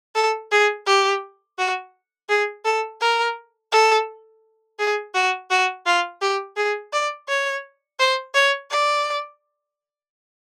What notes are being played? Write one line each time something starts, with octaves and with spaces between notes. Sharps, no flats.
A4
G#4
G4
F#4
G#4
A4
A#4
A4
G#4
F#4
F#4
F4
G4
G#4
D5
C#5
C5
C#5
D5